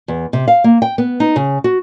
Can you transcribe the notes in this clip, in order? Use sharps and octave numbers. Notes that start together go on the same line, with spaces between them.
E2
C3
F5
A#3
G5
B3
D#4
C#3
F#4